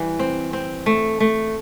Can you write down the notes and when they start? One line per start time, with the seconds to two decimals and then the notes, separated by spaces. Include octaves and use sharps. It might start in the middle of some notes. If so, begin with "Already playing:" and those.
Already playing: E3 G3
0.19 C4
0.53 C4
0.86 A3
1.20 A3